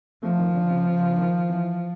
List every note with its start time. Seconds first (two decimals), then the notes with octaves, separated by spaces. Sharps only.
0.23 F3 A3
0.39 D#3
0.54 D3
0.70 C#3
0.86 C#3
1.10 D3
1.18 D#3
1.49 E3